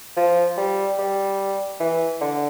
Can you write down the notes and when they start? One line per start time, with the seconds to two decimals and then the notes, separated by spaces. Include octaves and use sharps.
0.17 F3
0.57 G3
0.98 G3
1.80 E3
2.21 D3